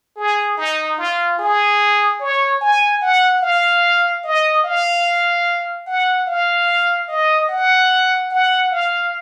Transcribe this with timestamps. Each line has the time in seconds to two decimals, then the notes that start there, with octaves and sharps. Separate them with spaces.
0.17 G#4
0.58 D#4
0.98 F4
1.39 G#4
2.20 C#5
2.61 G#5
3.02 F#5
3.42 F5
4.24 D#5
4.64 F5
5.87 F#5
6.27 F5
7.09 D#5
7.49 F#5
8.31 F#5
8.72 F5